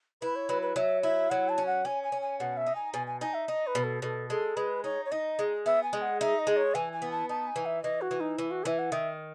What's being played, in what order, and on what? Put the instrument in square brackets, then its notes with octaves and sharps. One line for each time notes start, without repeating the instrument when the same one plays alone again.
[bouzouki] E4 [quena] B4
[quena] C#5
[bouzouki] F#3 [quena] B4
[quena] B4
[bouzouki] F#3 [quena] E5
[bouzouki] E4 [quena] E5
[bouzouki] F#3 [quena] F#5
[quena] A5
[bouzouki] C#4
[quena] F#5
[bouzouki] C#4 [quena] G#5
[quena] G#5
[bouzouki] C#4
[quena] G#5
[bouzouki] B2 [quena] F#5
[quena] E5
[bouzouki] D#4
[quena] G#5
[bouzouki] B2 [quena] G#5
[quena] G#5
[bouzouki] D#4 [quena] G#5
[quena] E5
[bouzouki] D#4 [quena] D#5
[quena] B4
[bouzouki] B2
[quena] A4
[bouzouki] B2 [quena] A4
[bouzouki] G#3 [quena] A4
[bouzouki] G#3 [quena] B4
[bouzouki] D#4 [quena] C#5
[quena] C#5
[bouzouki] D#4 [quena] D#5
[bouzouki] G#3
[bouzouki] B3 [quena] E5
[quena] G#5
[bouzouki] G#3
[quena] F#5
[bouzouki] D#4 [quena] E5
[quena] D#5
[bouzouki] G#3
[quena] C#5
[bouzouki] E3 [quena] G#5
[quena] G#5
[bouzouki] B3
[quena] A5
[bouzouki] D#4 [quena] A5
[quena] G#5
[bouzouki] E3
[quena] E5
[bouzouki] E3 [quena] D#5
[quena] F#4
[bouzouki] E3
[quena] D#4
[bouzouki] E3 [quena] E4
[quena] F#4
[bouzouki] E3 [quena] E5
[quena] F#5
[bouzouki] D#3 [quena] E5